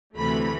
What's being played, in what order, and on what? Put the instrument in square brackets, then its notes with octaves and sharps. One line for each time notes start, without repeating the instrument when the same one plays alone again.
[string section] D2 C3 E3 A3 B5